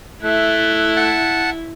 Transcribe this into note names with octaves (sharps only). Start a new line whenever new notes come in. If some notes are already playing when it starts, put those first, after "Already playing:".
A3 E4 F#6
F#5 A5